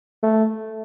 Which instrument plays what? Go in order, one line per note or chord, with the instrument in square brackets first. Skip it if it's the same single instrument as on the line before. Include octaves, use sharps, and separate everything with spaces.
[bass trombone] A3